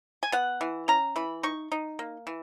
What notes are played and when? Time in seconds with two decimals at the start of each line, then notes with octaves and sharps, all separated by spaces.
0.23 G#5
0.32 B3 F#5
0.61 E3
0.88 C#4 A#5
1.16 E3 B5
1.43 D#4 C#6
1.72 D#4
1.99 A#3
2.27 E3